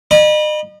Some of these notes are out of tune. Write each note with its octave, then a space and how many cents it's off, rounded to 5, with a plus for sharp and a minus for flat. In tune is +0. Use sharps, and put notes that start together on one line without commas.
D#5 -40 B5 -30